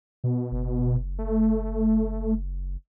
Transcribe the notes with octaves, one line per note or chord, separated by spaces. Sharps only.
B2
F#1
A3